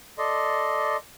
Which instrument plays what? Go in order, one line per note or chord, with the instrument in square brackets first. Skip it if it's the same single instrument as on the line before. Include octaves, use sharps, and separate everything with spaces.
[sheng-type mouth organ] A4 D5 D#5 C6